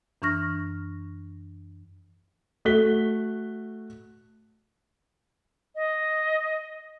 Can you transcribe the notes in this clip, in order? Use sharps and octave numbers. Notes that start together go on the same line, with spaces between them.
F#2 E3 D4 C#6 F6 A#6
A3 F#4 F#6 B6 G7
D#5